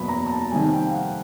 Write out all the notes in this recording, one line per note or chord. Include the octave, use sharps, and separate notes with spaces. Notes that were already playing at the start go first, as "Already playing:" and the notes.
Already playing: F#1 E2 B2 F#3 B5
A#5
A#5
A5
F2 C3 D#3 G3 G#5
G5
F5
F#5